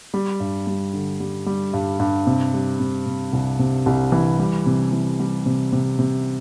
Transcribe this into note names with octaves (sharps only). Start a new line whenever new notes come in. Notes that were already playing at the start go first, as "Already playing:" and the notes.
G3
G2
G3
D3
G3
G3
G2
G2
C3
G3
C3
C3
C2
C3
C2
E3
G3
C3
E3
G3
C3
C3
C3